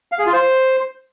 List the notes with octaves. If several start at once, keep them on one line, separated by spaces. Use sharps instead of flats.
F5
G#4
F4
C5